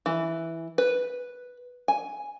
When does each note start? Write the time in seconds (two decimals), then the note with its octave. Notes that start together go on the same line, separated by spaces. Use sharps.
0.06 E3
0.78 B4
1.88 G#5